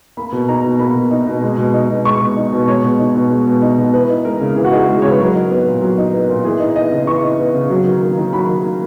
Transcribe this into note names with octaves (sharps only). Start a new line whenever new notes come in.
A#3 B5
B2
D#4 A#5
B2
A#3 B5
B2
D#4
B2
G#3
B2
D#4
B2
G#3 C#6
B2
D#4
B2
G#3 C#5
B2
D#4
B2
G#3
B2
D#4
B2
E3 B4
D#4
G#3 A#4
C#3
E3 G#4
F#4
D#4 G#4
G#3
C#3 C#5
B4
F#3 A#4
D#4
B3
A#2
F#3
D#4
B3
A#2
E3 G#4
D#4
B3 D#5
C#3
E3 C#6
D#4
B3
C#3
F#3
D#3
A#3
D#3
F#3 B5
D#3
A#3